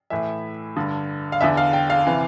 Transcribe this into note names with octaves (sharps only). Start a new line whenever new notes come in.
A2 E3 E5
G2 D3
F5
E2 D3 E5
F5
G5
F5
C3 E3